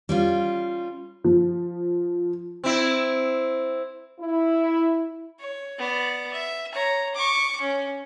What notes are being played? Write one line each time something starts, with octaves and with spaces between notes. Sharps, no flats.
G3 C#4 F4
F3
C4 E4
E4
C#5
B3 D5
E5
C#5 A#5
C#6 D6
C#4